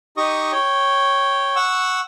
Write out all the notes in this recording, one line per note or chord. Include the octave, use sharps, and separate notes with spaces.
D#4 G4 D#5 C#6 D#6
C#5 G5
F#5 C#6 E6